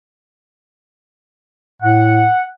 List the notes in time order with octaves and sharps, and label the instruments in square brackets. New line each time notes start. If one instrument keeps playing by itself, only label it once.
[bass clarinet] A2 [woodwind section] F#5